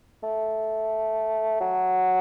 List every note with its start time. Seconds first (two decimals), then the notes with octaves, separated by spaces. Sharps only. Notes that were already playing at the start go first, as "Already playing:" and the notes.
0.23 A3
1.60 F#3